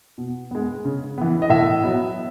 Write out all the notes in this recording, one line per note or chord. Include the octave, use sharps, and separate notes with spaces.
B2
G#3 B3
C#3
E3 B3
D#5
A2 E5
F#3 B3